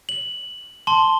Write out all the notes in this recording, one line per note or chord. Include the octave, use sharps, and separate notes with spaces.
F#7
A5 C6 G7